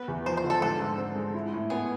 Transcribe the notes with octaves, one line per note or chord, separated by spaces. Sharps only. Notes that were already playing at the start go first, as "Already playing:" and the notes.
Already playing: B3 B4
E2
F3 C5
C5
D3
A4
G#2 A4
G#2
C4
G#3
E4
A2
B3 G#4